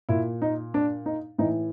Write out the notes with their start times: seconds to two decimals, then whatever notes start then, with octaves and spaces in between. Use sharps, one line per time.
0.09 A#2 E4
0.42 D#4
0.74 D4
1.06 D#4
1.38 A2 E3 D#4